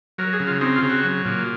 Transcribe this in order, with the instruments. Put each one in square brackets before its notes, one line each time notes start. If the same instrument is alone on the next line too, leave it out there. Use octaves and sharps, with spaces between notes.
[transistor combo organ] F#3 A#4
G#4
C#3
F4
C4 D#4
F4
C#3
F#4
F#3
A#2